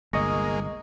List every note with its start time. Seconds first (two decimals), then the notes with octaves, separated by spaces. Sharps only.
0.13 G1 C2 G#3 A#3 D#5 C#6 D#6 A#6